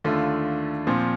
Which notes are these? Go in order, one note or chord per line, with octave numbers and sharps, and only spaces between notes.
D#2 D3 A3 D4 F4
A#2 F3 C4 F4